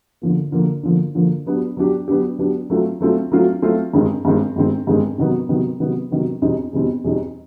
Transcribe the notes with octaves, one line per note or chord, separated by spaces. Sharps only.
D3 F3 A#3
D3 F3 A#3
D3 F3 A#3
D3 F3 A#3
F#3 B3 D4 G4
F#3 B3 D4 G4
F#3 B3 D4 G4
F#3 B3 D4 G4
F#3 A3 C4 F4
F#3 A3 C4 F4
F#3 A3 C4 F4
F#3 A3 C4 F4
G2 D#3 G#3 C4
G2 D#3 G#3 C4
G2 D#3 G#3 C4
G2 D#3 G#3 C4
C3 D#3 F#3 B3
C3 D#3 F#3 B3
C3 D#3 F#3 B3
C3 D#3 F#3 B3
E2 B2 G3 C4 D#4
E2 B2 G3 C4 D#4
E2 B2 G3 C4 D#4